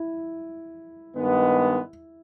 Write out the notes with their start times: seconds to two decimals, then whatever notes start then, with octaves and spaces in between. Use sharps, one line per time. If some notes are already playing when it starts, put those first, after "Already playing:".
Already playing: E4
1.16 G2 D#3 G#3 B3